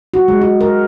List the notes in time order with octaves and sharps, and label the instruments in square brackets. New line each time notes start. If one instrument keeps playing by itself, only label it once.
[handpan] F#4
G#3
F#4
A#4